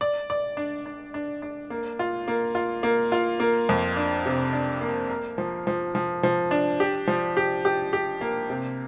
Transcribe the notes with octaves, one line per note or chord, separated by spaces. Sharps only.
D5
D5
D4
D4
D4
D4
A#3
F4
A#3
F4
A#3
F4
A#3
F2
D4
C3
D4
A#3
A#4
F3
F3
F3
F3
D4
G4
F3
G4
G4
G4
A#3
C3